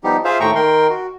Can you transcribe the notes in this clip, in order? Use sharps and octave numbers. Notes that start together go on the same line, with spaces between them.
F3 G3 B3 D#4 G4
F4 G#4 C5 E5 F5
D#2 A2 A3 G5 A#5 C#6
D#3 A#4 G5 C6
F#4